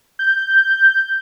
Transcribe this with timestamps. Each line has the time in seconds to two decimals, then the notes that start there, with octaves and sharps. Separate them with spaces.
0.19 G6